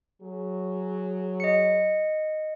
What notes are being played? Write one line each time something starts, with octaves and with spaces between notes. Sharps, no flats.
F#3 G#4
D#5 C#7